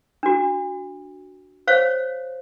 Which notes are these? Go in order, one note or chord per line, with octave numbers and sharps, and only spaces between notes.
D4 F#4
C5 C#5 F5